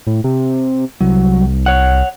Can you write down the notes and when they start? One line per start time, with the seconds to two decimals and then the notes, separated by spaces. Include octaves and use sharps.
0.07 A2
0.24 C3
1.01 C2 F#3
1.66 C#5 F#5